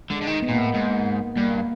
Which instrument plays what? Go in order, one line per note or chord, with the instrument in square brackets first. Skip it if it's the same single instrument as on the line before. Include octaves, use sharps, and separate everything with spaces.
[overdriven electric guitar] D3 [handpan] G#3
[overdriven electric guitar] D3
D#3
[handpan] B3
[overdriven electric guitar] A#2 [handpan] A#3
[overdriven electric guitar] A2
G#2
[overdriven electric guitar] G2 [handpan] A#3